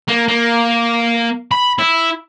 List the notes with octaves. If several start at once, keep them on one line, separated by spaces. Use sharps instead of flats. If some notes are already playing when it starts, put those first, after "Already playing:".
A#3
A#3
B5
E4